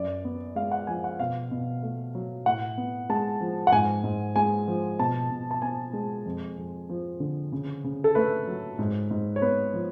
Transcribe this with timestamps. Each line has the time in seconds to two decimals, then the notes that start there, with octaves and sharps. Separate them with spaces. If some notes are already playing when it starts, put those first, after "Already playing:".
Already playing: F#2 D5
0.24 B3
0.56 G#3 F5
0.72 F#5
0.87 F3 G#5
1.04 F#5
1.19 B2 F5
1.51 B2
1.83 A3
2.15 F#3
2.46 A2 F#5
2.77 B3
3.09 G#3 A5
3.41 F3
3.67 F#5
3.72 G#2 G#5
4.04 G#2
4.36 G#3 G#5
4.68 F3
4.99 B2 A5
5.31 B2
5.51 A5
5.62 B3 G#5
5.93 G#3
6.26 F2
6.58 F2
6.89 F3
7.20 D3
7.52 C#3
7.84 C#3
8.04 A4
8.15 A3 B4
8.48 F#3
8.79 G#2
9.11 G#2
9.36 C#5
9.42 B3 B4
9.74 F3